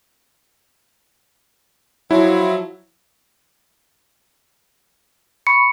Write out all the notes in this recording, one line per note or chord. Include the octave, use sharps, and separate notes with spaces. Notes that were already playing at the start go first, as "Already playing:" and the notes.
F3 F#3 E4
B5 C#6 C#7